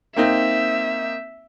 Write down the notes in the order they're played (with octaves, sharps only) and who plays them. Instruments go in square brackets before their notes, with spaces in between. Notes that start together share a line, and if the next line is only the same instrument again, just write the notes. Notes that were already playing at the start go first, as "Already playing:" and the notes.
[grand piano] A#3 C4 D#4 [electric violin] E5